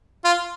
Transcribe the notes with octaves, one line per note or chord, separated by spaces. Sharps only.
F4